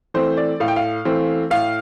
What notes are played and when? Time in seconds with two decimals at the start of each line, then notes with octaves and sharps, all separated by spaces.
0.14 E3 A3 C4 C5
0.37 D5
0.60 A2 F5
0.68 G5
0.76 F5
1.05 E3 A3 C4
1.50 A2 F5